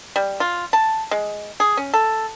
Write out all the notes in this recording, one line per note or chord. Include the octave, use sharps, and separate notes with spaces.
G3
F4
A5
G#3
G#4
C#4
A4